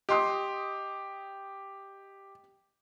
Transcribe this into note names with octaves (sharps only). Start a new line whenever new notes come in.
G4 D#5 C6 D#6